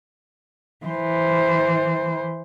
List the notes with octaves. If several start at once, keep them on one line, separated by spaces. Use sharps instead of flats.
E3 C5